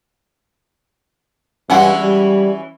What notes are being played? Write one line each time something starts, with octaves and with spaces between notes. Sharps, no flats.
G2 E3 G#3 C#4 E4 F#4 F#5
G3